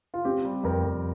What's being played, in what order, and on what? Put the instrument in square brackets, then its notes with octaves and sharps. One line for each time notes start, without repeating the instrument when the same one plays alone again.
[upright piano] F4
[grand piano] C4 [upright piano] G4
[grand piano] G3
[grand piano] F2 [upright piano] A#4
[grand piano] F2